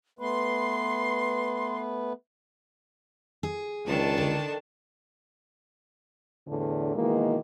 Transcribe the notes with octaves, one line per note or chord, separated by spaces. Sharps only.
A3 B3 B4 C6
G#4
C#2 D#3 D4 A5
D3
E2 A2 D3
B2 D#3 E3 G#3 A#3